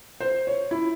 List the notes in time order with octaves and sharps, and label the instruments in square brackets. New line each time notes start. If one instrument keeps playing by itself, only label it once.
[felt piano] C5
C#5
E4